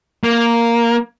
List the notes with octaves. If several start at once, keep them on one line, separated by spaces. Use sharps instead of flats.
A#3